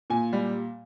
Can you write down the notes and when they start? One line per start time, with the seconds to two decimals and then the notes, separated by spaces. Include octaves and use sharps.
0.10 A#2 G#5
0.33 G3